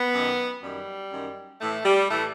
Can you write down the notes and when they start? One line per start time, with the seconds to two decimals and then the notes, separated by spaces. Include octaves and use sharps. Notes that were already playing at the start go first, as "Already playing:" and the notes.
Already playing: B3
0.14 F#2 D#3
0.62 F#2 D#3 G3
1.12 F#2 D#3
1.61 A2 E3 A3
1.85 G3
2.09 A2 E3 A3